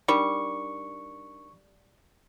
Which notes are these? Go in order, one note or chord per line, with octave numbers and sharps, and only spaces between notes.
G3 D4 D#4 A#4 C#6